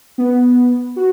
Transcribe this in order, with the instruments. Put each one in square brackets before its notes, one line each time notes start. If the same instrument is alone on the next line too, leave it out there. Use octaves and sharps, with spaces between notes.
[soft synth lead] B3
F#4